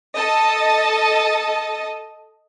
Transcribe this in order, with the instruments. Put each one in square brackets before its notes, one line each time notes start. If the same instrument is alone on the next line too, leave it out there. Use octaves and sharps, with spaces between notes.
[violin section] A4 D#5 A5